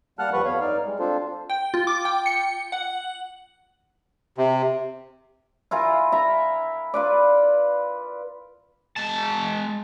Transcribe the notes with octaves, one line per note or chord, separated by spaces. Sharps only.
G3 A#3 F#5 A5 F6 F#6
D#2 F3 G3 B4 B5 C#6
F2 B3 C#5 F5
G2 D#4 D5 F6
G3 G#3
C4 D4 F4 A4 C5
G5
F4
D6
G5
C#7
F#5
C3
E4 F4 A#4 G#5
E5 A#5
F4 B4 D5
G#3 A5